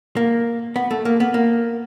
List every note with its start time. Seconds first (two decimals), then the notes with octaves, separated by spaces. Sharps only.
0.17 A#3
0.76 B3
0.91 A3
1.05 A#3
1.20 B3
1.34 A#3